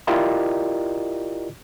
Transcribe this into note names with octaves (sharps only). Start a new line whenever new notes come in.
E4 F4 G4 A#4 D5 D#5